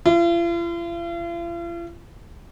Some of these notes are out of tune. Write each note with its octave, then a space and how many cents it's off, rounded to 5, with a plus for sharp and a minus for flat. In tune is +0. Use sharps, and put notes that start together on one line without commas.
F4 -45